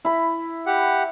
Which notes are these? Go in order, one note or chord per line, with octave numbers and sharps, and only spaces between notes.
E4 B5
G4 F#5